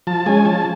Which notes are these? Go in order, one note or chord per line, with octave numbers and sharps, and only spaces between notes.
F3 A5
G#3 C#4 G#5
F3 A5